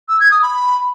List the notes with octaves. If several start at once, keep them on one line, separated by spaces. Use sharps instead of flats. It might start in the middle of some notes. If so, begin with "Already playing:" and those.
E6
G#6
D#6
B5